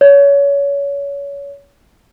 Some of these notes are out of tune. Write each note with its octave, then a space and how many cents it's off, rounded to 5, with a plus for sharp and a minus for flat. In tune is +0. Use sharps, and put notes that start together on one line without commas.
C#5 +25